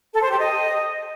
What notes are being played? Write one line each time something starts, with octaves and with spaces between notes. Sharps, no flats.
A4
C5
G4
D#5